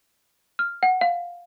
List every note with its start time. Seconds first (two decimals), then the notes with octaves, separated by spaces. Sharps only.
0.59 F6
0.83 F#5
1.01 F5